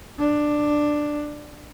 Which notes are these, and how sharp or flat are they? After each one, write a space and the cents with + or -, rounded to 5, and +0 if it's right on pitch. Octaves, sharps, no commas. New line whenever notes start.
D4 +10